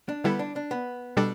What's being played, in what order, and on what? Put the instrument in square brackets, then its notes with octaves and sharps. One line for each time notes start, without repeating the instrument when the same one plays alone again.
[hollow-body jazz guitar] D4
[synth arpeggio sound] D3 G3 E4 A4 [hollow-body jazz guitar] B3
[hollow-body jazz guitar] D4
D4
B3
[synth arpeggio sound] B2 G3 D4 A4 D5